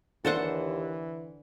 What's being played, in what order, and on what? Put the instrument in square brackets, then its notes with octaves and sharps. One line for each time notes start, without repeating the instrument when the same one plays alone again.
[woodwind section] D#2 [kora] D3 [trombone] E3 [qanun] A4 C5 F#5